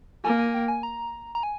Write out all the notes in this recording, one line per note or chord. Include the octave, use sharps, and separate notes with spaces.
A#3 G#5
G#5
G5
G#5
A#5
A#5
G#5